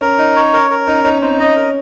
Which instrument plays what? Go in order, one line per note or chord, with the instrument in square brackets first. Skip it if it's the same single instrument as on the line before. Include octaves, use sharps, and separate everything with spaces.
[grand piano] C#4 [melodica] A#4
[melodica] D#4
C#5
A#4
A#4
[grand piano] C#4 [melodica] D#4
[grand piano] C#4 [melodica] D#4
[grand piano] C4 [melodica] D#4
[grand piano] C#4 [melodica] D#5
[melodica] A#4